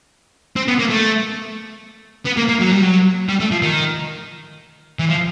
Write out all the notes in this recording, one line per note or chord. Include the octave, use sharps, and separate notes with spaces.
C4
B3
A#3
A3
B3
A#3
A#3
F#3
G3
F#3
G3
A3
F3
D#3
E3
F3